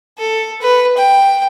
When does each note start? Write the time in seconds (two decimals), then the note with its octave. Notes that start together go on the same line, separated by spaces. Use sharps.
0.18 A4
0.61 B4
0.97 G5